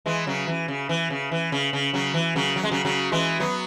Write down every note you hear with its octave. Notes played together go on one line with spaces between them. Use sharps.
E3 G#3
C#3 F#3
E3
C#3
E3
C#3
E3
C#3
C#3
C#3 F#3
E3
C#3 F#3
F#3
G#3
C#3 F#3
C#3 F#3
E3 G#3
F#3 B3